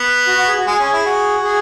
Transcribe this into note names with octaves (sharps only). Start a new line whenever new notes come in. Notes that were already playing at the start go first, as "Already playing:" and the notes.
Already playing: B3
F#4
F#4
G#4
F#4
G#3 G#4
C#4
E4
F#4
G#4